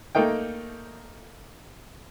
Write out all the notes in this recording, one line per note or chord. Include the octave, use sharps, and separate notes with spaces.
A3 A#3 D#4 G5